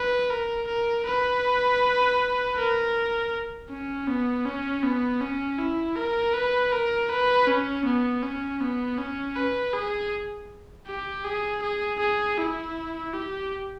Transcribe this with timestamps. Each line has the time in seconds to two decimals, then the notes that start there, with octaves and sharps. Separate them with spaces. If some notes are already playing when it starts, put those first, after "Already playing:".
Already playing: B4
0.30 A#4
0.68 A#4
1.06 B4
2.56 A#4
3.70 C#4
4.07 B3
4.45 C#4
4.83 B3
5.21 C#4
5.58 E4
5.96 A#4
6.34 B4
6.72 A#4
7.10 B4
7.47 C#4
7.85 B3
8.23 C#4
8.61 B3
8.98 C#4
9.36 B4
9.73 G#4
10.87 G4
11.24 G#4
11.62 G#4
12.00 G#4
12.38 E4
13.13 G4